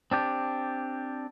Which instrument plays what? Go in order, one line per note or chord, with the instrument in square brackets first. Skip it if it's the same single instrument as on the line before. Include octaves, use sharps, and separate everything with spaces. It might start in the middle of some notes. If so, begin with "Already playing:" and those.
[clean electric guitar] C4 D4 G4